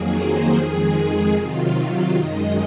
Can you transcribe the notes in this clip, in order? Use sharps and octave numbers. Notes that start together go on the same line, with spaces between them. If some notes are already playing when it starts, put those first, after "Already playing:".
Already playing: F2 D#3 F#3 A#3 G#4
C5
F2 D#3 G#3 G#4
C3 D#3 F#3 F4
F#2 D#3 G#3 D#5